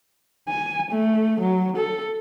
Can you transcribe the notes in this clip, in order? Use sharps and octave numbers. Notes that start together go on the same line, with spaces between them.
G#5
A3
F#3
A4